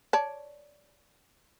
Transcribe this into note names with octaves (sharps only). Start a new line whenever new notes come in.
C#5 D5 A5